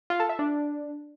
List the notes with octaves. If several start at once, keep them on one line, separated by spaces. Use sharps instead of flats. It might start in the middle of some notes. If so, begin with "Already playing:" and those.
F4
A4
E5
D4